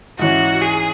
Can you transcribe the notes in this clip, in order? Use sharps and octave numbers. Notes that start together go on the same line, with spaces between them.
G#2 E3 C#4 F#4
G#4